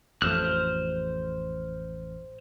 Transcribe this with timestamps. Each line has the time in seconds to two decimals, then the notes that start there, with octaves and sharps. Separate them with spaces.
0.22 A1 F2 A3 C5 F6 F#6